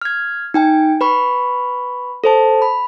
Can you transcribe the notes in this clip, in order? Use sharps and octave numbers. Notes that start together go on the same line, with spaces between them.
F6 G#6
D#4 G5 G#5
B4 B5 C#6
A4 C5 A5
B5